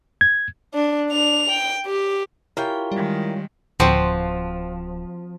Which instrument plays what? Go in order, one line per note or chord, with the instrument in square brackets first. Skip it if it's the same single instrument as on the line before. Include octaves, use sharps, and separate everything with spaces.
[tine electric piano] G#6
[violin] D4
D4 F7
G5
G4
[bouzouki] C#4 F4 G5 [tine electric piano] E4 G4 A#4
[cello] D#3 G#3 [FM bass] G3
[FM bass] D1 [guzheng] F3 [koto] C4 F#4